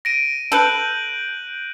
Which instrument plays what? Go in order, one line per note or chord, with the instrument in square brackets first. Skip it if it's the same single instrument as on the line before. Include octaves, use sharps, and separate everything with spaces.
[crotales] A#6 D7 D#7
[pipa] A4 B4 [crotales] F#6 G6 F#7